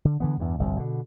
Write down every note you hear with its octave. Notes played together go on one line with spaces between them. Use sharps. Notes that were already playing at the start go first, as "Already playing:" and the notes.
D3
D3 E3 B3
E2 G2
G1 C2 F2
B2 D3